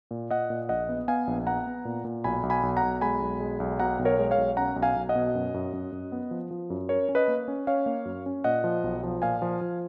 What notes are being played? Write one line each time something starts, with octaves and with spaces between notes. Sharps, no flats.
A#2
A#2 D#5 F#5
A#2
A#1 D#5 F#5
B3
B3 F5 G#5
A#1
B3 F#5 A#5
B3
A#2
A#2
B1 G#5 B5
B1
G#5 B5
B1
F#5 A#5
B1
G#3 G#5 B5
B1
G#3
B1
B2 F#5 A#5
B1
A#4 C#5
G#3
C#5 F5
B1
C#4 F#5 A#5
B1
F5 G#5
B1
D#5 F#5
B2
F#2
F#2
F#2
F#2
B3
F3
F3
F#2
C#4 A#4 C#5
C#4
B4 D#5
A#3
C#4
C#4 C#5 F5
A#3
F#2
C#4
A#2 D#5 F#5
F3
B1
F3
A#2 F5 G#5
F3
F3